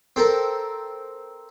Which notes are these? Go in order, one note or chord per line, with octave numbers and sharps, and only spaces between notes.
C4 A4 A#4